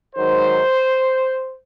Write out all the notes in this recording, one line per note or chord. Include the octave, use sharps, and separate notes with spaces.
G#2 D#3 F#3 C5